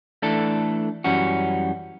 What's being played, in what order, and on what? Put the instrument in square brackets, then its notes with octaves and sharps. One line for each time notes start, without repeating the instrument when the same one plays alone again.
[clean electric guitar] E3 A3 D4 A4
F#2 E3 G3 C#4 F#4